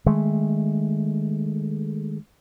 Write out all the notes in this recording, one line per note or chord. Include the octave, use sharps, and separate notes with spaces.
D#3 G#3 A3